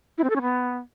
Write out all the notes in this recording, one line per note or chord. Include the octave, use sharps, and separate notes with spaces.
E4
C4
A4
C#4
B3